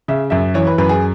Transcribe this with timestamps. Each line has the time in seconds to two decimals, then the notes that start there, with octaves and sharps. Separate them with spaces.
0.08 C#3 E5
0.30 F#2 E5
0.54 E3 C#5
0.67 B4
0.78 F#2 B4
0.89 G#4